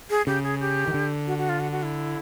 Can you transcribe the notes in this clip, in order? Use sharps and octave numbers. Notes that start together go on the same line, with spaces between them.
G#4
C#3 G4
G#4
G4
D#3
D3
F#4
F#4
F4
F#4
F#4
E4